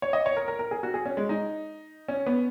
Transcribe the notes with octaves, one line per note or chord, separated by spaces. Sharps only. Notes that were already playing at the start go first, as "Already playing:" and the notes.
C#5
D#5
C#5
A#4
A#4
A#4
G#4
F#4
G#4
C#4
G#3
D#4
C#4
B3